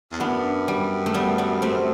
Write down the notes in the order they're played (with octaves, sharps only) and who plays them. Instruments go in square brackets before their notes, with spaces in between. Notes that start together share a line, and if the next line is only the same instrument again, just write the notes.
[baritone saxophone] E2
[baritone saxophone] F#2 [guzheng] B3 D4
[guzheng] G3
A3
G3 B3
G3 B3
A3 C4